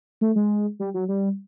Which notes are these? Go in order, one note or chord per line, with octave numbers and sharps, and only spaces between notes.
A3
G#3
G3
F#3
G3